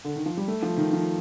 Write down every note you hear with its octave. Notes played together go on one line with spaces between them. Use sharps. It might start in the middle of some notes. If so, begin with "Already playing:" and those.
D3
D#3
F3
G3
A3
F3
D#3
F3